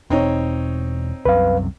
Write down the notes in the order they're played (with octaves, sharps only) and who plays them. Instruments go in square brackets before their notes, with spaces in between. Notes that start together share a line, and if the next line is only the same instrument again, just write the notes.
[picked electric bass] E1 [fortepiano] C4 D#4 C#5
[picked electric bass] C2 F#2 C3 [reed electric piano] B4 F5